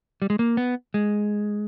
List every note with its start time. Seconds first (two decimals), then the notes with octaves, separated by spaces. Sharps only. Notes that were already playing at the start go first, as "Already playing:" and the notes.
0.22 G3
0.30 G#3
0.39 A#3
0.57 B3
0.94 G#3